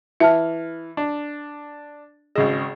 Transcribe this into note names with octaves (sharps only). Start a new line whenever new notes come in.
E3 E5 A5 F6
D4
G#1 C#3 G#4 D#5